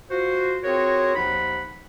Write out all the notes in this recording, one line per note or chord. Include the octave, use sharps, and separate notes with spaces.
F4 F#4 C5
C4 F4 F#4 G#4 A#4 C#5
D#2 F3 D#4 F#5 B5